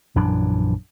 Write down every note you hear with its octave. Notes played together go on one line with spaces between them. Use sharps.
A#1 F#2 E3 D4